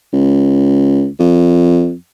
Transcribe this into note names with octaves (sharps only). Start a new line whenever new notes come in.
C#2
F2